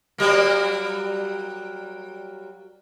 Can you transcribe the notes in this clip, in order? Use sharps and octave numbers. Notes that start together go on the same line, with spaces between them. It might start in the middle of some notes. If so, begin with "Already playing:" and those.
F#3 G3 A#3